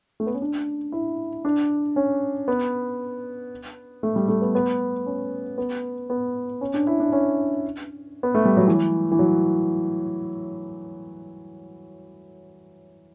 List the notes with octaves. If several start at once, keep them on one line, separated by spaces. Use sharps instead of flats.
A3
B3
C#4
D4
E4
D4
C#4
B3
A3
G3
A3
B3
B3
C#4
B3
B3
C#4
D4
E4
D4
C#4
B3
A3
G3
F#3
E3
E3
F#3